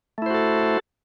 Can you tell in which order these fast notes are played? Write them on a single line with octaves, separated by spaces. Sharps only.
A3 E4 C5 F#4 A4